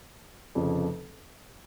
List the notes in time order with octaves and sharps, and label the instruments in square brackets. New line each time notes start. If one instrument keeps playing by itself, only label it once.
[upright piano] F1 F2 C#3 F3